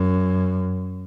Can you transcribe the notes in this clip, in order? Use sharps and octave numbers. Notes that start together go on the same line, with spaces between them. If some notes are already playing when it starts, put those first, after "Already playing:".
Already playing: F#2